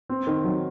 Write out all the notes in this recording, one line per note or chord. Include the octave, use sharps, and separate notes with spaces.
C4
D#3
F#3